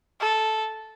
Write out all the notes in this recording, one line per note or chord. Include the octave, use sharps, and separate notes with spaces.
A4